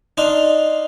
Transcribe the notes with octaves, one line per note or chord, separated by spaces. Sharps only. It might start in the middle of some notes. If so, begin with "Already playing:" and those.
D4 D#4 F5 C6